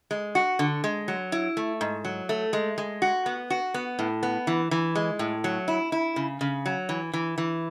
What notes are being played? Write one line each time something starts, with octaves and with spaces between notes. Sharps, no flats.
G#3
F#4
D3
G#3
F#3
E4
A3
G#2
F#3
A3
G#3
G#3
F#4
B3
F#4
B3
A2
B3
E3
E3
G#3
A2
F#3
E4
E4
C#3
C#3
F#3
E3
E3
E3